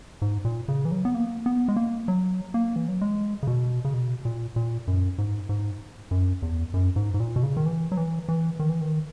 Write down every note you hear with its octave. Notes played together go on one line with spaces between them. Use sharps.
G#2
A#2
C#3
E3
F#3
B3
A#3
B3
G#3
A#3
F#3
A#3
E3
F#3
G#3
C#3
B2
C#3
B2
A#2
A#2
F#2
G#2
G#2
F#2
E2
F#2
G#2
G#2
A#2
B2
C#3
D#3
E3
F#3
E3
E3
D#3
E3
D#3